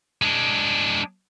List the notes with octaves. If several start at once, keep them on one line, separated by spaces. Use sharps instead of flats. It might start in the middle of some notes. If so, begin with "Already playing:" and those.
G#3 D4